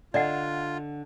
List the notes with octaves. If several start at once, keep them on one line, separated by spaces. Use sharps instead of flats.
D3 F4 D5 D#5 F#5